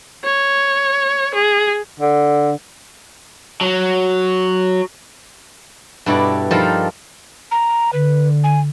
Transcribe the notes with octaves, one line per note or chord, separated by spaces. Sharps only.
C#5
G#4
D3
F#3
G2 B2 E4 A4 D5
F3 G3 D#4 A4 A#4 C5
A#5
D3 B4
G#5